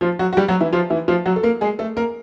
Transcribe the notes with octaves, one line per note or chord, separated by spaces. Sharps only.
F3 F4
F#3 F#4
F#4
G3 G4
F#3 F#4
E3 E4
F3 F4
E3 E4
F3 F4
F#3 F#4
A4
A#3 A#4
G#3 G#4
A3 A4
A#3 A#4